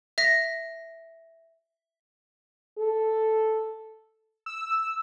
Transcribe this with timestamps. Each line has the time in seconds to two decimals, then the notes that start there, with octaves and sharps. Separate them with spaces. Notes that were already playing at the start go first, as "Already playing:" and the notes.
0.18 E5 A#6
2.78 A4
4.46 E6